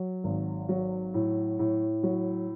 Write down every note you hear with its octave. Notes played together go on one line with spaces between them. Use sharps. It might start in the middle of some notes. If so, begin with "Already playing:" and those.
Already playing: F#3
G#1
F#3
A2
A2
F#3